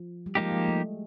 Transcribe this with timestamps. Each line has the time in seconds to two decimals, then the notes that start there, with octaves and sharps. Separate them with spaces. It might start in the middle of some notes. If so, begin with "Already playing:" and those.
Already playing: F3
0.26 G3
0.35 F3 G#3 A#3 D#4 G4
0.51 G#3
0.68 A3